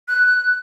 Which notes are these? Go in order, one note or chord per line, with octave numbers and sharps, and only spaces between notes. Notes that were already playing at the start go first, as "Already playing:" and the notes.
F#6